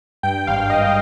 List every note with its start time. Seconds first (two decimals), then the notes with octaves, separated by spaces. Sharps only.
0.23 G2 G5
0.47 G#1 F5
0.70 G2 D#5